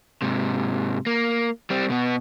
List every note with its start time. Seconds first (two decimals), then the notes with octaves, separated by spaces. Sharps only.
0.22 G#2 C3
1.06 A#3
1.70 G3 C4
1.90 B2 B3